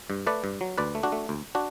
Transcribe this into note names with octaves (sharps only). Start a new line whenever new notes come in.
G2
A3 B4 D5
G2
F#3
D2 B4 D5
A3
D4 F#4
A3
D2
D4 F#4